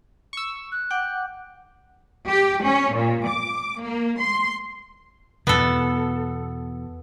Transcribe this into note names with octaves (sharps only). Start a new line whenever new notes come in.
C#6 E6
F#6
F#5 G5 D6
G4
C#4
A#2
D6
A#3
C6
E2 B2 B3 A4